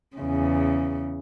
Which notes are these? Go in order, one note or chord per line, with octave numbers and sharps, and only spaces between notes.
E2 C#3